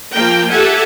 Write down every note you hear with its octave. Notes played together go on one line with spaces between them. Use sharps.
F3 A#3 A#4 G5
G4 A4 E5 F#5 G#5